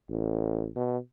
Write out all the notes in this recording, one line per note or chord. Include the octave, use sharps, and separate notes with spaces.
A1
B2